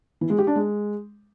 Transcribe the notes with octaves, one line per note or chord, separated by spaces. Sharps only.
E3
G#3
G4
D4
G#3